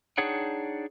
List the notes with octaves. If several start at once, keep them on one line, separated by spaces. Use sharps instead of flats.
D4 D#4 G#4 C#5 F#5 G5